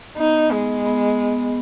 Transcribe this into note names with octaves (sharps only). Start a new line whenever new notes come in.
B3 D#4
G#3 B3
B3
B3